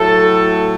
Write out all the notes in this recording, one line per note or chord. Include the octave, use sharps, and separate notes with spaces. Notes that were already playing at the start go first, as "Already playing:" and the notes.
Already playing: A2 F#3 A3 A4